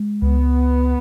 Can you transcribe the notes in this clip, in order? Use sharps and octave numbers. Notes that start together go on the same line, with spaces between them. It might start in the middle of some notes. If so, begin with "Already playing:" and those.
Already playing: G#3
C#2 B3